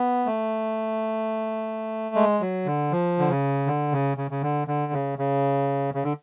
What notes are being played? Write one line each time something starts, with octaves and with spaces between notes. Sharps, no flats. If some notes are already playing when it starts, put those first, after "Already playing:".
Already playing: B3
A3
G#3
F#3
D3
F3
D3
C#3
D3
C#3
C#3
C#3
D3
D3
C#3
C#3
C#3
D3